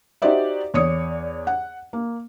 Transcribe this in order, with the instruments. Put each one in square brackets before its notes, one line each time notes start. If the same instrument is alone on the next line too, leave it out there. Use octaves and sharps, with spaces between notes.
[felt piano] D#4 F#4 G4 C5 D5 E5
E2 C#5 D5 D#6 C#7
F#5
A#3